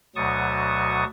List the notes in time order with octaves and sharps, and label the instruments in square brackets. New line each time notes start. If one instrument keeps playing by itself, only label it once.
[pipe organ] D2 B2 F#3 A5 C#6 D#6